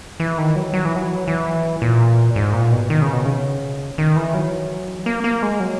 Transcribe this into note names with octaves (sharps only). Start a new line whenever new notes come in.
E3
D#3
F#3
F#3
E3
F#3
E3
A#2
G#2
A#2
B2
D#3
C#3
B2
C#3
D#3
E3
F#3
A#3
A#3
G#3
F#3